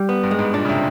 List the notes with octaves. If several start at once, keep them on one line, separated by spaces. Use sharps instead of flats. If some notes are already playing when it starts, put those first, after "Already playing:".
Already playing: G3
B3
G2
G#3
G#2
A#2 D4
C#3
C3